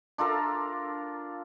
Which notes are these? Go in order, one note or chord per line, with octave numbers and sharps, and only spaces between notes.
D4 F4 A4 A#4